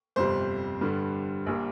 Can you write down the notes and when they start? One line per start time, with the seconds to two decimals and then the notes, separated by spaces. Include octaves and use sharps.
0.16 G1 F2 C3 G3 C5
0.81 G2 D3 G3
1.46 A#1 A#2 G3 A#3